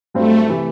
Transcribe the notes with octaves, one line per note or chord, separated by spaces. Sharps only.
G2 F#3 A3 C4
C3 E3